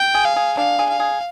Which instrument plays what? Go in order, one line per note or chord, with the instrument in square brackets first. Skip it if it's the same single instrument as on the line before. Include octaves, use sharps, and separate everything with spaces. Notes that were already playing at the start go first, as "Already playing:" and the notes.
Already playing: [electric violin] G5
[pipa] G#4
[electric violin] F5
[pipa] G#4
[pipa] D4 [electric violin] F5
[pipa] G#4
[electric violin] F5
[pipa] G#4